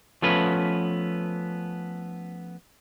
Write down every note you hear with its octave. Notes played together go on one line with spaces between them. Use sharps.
F3 A3 B3 C#4 B4